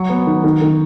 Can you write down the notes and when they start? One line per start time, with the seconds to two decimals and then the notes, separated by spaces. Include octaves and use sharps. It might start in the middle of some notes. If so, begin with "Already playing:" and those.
Already playing: F#3 C#6
0.10 B3
0.26 D#3
0.44 D#3
0.62 D#3